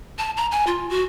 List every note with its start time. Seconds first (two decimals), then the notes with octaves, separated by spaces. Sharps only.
0.19 A5
0.37 A#5
0.51 G#5
0.67 F4
0.90 F#4